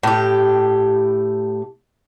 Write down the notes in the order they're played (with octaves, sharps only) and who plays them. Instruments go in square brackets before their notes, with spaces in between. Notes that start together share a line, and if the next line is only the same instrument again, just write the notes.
[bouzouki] A2 G4